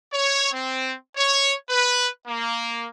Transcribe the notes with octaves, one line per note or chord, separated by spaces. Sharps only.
C#5
C4
C#5
B4
A#3